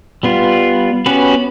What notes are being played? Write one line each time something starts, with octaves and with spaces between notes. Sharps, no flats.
G3 B3 F4
B3 C#4 F#4 G4 B4